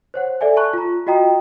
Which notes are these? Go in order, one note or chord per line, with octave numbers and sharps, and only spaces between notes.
C5 C#5 F#5
A4 D5 E5 G#5
A5 B5 C#6 F#6
F4 A#5
F4 F#4 D#5 G5 A#5 D#6